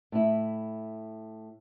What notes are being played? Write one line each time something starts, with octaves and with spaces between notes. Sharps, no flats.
A2 E4